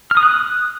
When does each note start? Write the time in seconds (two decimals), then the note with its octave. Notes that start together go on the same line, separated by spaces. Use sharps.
0.11 F6
0.17 D#6
0.23 F#6